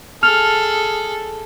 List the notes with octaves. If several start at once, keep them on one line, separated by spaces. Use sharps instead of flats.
G#4 A4 F6 F7